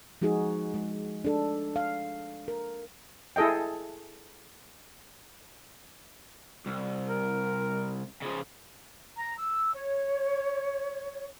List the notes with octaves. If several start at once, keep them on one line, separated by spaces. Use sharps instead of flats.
F3 G#3 D#4 F#4 G#4
G#3
D4 A4
F5
A#4
E4 G#4 A4 D#5 G5
C2
A#4
C#3 F3
A#5
E6
C#5